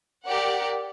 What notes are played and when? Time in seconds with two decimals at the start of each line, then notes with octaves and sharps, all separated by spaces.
0.25 G4 A#4 D5 F#5